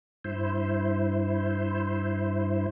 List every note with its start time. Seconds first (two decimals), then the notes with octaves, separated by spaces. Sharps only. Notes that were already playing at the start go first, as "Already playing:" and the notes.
0.25 G2 E4 C5